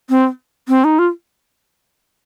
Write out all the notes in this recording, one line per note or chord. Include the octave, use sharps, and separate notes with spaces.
C4
C4
D#4
F4